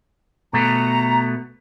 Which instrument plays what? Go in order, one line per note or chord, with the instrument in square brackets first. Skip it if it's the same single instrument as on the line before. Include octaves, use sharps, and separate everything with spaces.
[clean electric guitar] B2 A3 B3 [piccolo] A#5